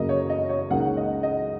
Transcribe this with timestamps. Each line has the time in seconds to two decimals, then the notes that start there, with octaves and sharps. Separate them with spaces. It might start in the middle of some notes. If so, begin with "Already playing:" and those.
Already playing: F#2 C#3 A#3 D#5
0.09 C#5
0.30 D#5
0.49 C#5
0.70 C#2 C#3 A#3 D#4 F#5
0.97 D#5
1.23 D#5